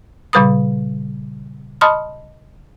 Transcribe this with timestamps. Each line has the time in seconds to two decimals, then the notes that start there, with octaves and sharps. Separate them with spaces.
0.33 A#2 C#3 G3 B4 B5 D#6
1.81 D#5 A5 B5 C6 D#6 F6